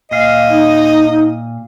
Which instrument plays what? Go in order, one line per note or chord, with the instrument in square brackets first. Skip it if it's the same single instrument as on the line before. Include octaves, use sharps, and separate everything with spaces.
[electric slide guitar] A#2 F5 [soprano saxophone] D#5
[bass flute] D#4